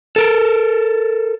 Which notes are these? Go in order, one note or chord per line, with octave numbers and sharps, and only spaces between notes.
A4 A#4